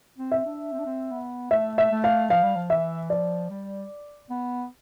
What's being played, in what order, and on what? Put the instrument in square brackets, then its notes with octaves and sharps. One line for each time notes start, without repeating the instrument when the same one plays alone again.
[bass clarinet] C4
[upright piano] E5
[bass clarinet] D4
C4
D4
C4
B3
[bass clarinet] A3 [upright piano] E5
[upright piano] E5
[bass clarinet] A3
[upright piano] F5
[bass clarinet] F3 [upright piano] F5
[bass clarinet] G3
F3
[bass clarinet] E3 [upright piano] E5
[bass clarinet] F3 [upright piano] D5
[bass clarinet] G3
B3